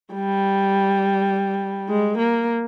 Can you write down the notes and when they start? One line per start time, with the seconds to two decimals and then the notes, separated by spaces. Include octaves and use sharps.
0.13 G3
1.88 G#3
2.18 A#3